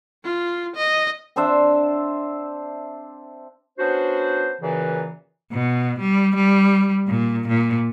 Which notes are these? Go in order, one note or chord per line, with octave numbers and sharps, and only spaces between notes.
F4
D#5
C4 D4 C5 E5
B3 C#4 D4 F#4 C5
F#2 A#2 C#3 E3
B2
G3
G3
A#2
A#2